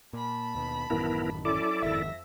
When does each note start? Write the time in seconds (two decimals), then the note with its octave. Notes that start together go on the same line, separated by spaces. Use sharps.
0.13 A#2 A5 B5
0.55 D#2 B2
0.90 A1 F#2 D#3 B3 E4 A#4
1.45 F#3 C#4 E4 A4 D5 D6
1.83 F#1 F2 G#2 D#3 E5 A#6